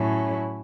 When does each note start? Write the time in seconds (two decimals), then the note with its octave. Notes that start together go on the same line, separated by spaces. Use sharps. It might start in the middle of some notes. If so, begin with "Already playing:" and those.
Already playing: A2 F#3 C#4 E4